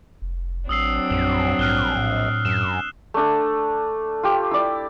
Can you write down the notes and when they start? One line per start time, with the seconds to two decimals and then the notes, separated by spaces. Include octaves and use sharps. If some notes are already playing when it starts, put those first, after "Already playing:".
0.22 F1
0.69 A1 F#3 C4 D4 D#6 E6 C7
1.10 A#1 F#2
1.59 A#1 G#2 F6 F#6 G7
1.96 A2
2.45 F#2 E7
3.14 A3 D4 A4
4.23 F4 G4
4.51 E4 D5